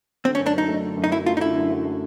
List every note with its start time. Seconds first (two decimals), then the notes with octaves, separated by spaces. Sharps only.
0.25 D3 C4
0.35 C#4
0.39 F#2
0.46 D4
0.54 F#3 D#4
0.68 A3
0.83 D3
0.97 F#2
1.04 D#4
1.12 F#3 E4
1.26 A3 F4
1.37 D#4
1.41 D3 E4
1.56 F#2
1.71 F#3
1.85 A3